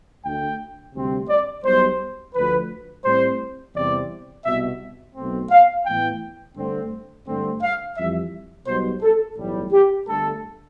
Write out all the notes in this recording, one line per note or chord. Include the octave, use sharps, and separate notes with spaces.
D2 D3 A3 G5
D2 C3 G3 C4
D5
B1 B2 G3 C5
D2 D3 F3 B4
A2 G3 C4 C5
E2 C3 E3 G3 C4 D5
C2 B2 B3 E5
B1 B2 A3 C4
F5
A2 E3 B3 G5
G2 D3 A3 C4
G2 D3 A3 C4
F5
F2 E3 G3 E5
B1 B2 G3 B3 C5
A4
B1 A2 E3 G3
G4
G1 G2 D3 A3 A4